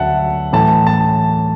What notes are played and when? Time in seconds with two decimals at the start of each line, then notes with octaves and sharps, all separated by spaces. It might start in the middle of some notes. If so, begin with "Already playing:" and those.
Already playing: D2 F#3 E5 F#5 A5
0.53 A2 E3 A5
0.87 A5